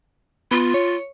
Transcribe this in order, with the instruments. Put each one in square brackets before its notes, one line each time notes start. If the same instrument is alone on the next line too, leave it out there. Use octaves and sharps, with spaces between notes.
[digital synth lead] B3 [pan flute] F4
[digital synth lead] C#5